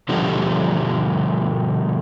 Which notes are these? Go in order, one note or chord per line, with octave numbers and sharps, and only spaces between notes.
B2 D3 F3 G3 D4 G4